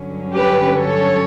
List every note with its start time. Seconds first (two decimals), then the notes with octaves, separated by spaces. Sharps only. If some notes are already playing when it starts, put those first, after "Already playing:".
Already playing: G2 D3 F#3 C#4
0.34 G4 B4
0.76 A4 C#5